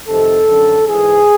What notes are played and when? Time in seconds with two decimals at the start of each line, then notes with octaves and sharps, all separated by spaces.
0.08 F2 C3 D#3 A4
0.48 F#2 D3 F#3
0.88 G#2 E3 G#4